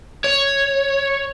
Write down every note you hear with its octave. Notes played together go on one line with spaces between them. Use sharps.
C#5